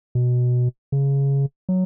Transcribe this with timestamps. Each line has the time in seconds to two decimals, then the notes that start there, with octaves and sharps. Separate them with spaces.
0.15 B2
0.92 C#3
1.69 F#3